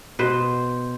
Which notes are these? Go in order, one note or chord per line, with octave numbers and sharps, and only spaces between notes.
B2 B4 C5